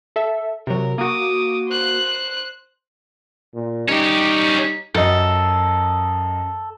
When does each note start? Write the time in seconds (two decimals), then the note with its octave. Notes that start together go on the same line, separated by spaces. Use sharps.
0.16 A4 E5
0.67 C3 F#3 A#4
0.98 A#3 F#4 D6 D#6
1.68 C5 F#6
3.55 A#2
3.89 G3 C#4 D#4 G4
4.95 F#2 A4 D#5